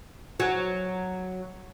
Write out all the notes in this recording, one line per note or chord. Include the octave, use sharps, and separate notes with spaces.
F#3